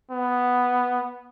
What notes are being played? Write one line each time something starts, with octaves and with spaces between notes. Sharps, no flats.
B3